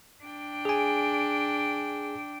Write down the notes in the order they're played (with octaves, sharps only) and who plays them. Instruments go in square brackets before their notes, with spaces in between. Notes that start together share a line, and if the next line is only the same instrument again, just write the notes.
[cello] D4 G5
[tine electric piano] G#4 G#5